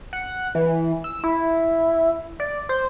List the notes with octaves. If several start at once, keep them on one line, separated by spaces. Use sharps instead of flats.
F#5
E3
E6
E4
D5
C5